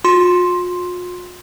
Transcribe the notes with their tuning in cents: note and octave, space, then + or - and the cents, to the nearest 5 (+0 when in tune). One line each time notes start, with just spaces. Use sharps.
F4 +45 C6 +5